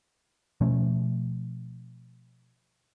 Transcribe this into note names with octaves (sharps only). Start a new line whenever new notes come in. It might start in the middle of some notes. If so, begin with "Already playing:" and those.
B2 F3 A3 C#4